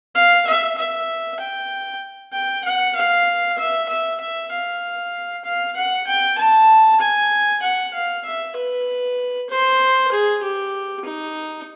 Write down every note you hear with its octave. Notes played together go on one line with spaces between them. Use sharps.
F5
E5
E5
G5
G5
F#5
F5
E5
E5
E5
F5
F5
F#5
G5
A5
G#5
F#5
F5
E5
B4
C5
G#4
G4
D#4